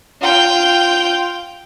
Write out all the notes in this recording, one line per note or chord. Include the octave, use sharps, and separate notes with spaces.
F4 G5